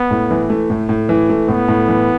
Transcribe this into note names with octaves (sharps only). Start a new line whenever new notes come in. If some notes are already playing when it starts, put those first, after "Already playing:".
Already playing: B3
A2
E3
A3
A2
A2
E3
A3
A2 B3
A2
E3